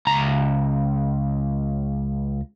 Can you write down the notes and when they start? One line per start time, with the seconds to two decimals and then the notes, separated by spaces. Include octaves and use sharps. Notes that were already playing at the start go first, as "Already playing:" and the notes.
0.07 C#2 A#5